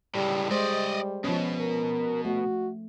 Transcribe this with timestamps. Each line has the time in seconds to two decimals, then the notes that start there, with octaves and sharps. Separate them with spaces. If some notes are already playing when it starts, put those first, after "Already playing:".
0.15 C#2 A2 G3
0.51 G3 G#3 C5 D5 D#5
1.24 B2 F3 C#4
1.60 A#4
2.25 A3 F#4